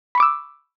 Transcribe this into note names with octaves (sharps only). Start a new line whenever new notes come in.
B5 C#6 D6 E6